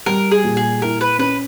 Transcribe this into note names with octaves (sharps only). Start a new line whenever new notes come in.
G3 A#4
G#4
A#2
G#4
E4 A#4
B4
C#4 B4